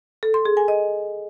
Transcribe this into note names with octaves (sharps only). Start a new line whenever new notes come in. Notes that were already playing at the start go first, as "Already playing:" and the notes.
A4
C6
G#4
G#5
D#5